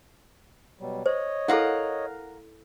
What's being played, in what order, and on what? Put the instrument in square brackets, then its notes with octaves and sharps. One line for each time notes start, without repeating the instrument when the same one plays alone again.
[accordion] B2 F#3 G3
[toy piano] C5 [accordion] C#5 D#5
[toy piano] E4 A4 [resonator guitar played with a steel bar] A#4 F5 F#5